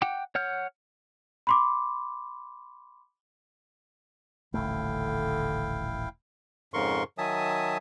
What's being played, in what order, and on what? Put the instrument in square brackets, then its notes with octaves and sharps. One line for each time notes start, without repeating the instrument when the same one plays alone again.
[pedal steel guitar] F#5 G5 D6
C#5 F#5 F6 G6
[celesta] B5 C6 D6
[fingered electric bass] D#1 A1 A3 [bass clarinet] D3 [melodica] E4 F5 G5
[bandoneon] F2 G#2 C#3 A#4 C6 C#6
D#3 F#3 E5 G#5 A5 D#6